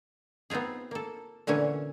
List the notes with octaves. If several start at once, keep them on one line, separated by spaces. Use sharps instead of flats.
B3 C4 D#4 F4 G#4
A#3 A4
A#2 D3 E3 C#4 C#5